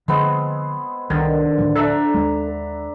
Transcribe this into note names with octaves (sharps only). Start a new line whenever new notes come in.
D3 F3 G#3 B3 C4
C2 D3 D#3
D2 A2 F3
D4 A4 E5 A#5
D#2 G#3